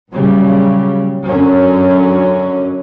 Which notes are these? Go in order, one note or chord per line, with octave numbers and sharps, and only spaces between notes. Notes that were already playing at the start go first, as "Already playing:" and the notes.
A#2 C#3 F#3 G3
F#2 D3 F#3 C#4